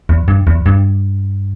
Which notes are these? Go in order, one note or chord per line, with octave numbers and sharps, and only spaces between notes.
E2
G2
E2
G2